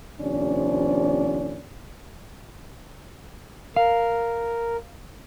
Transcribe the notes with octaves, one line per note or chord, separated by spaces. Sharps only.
D#2 C3 F3 C#4 D4 D5
A#4 F5